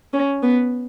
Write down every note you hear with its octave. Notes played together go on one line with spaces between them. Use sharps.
C#4
B3